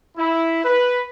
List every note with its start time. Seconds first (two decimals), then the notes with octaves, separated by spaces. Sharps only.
0.17 E4
0.64 B4